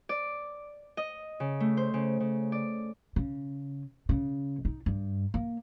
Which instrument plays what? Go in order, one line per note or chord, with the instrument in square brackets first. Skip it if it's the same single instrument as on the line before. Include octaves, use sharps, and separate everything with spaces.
[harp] D5
D#5
C#3
A3
C5
C#3
C#3
D5
[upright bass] C#3
C#3
D#4
G2
A#3